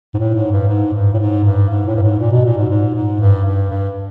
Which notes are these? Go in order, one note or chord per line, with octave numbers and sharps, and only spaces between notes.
G#2
A2
G#2
G2
G#2
G2
A2
G#2
G2
G#2
A2
G2
G#2
A#2
B2
A#2
G#2
G#2
G#2
G2
G2
G2